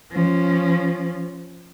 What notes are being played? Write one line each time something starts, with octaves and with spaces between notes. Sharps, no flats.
F3 C#4